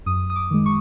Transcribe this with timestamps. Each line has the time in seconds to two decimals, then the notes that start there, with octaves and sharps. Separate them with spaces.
0.06 F#2 D#6
0.30 D#6
0.36 D6
0.51 D#3 G#3
0.66 C#6